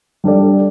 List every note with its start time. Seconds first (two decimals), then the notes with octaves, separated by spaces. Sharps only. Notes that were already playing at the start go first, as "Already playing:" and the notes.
0.24 G3 D4 A4 D5